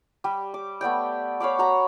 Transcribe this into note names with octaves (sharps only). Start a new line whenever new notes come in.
G3 G4
D6
A3 B3 D5 G5
C#5 F5 B5 D6
F#4 A#5 B5